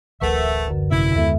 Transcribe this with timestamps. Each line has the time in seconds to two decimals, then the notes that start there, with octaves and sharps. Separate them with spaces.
0.21 D1 A1 A3 A#4 B4 E5 F#5
0.68 F#2 D3
0.91 G#1 C3 C#4 E4
1.16 D#2 G#3 B3 A4 E5